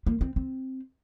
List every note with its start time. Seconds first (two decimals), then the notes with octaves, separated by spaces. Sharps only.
0.06 A#3
0.21 C4
0.36 C4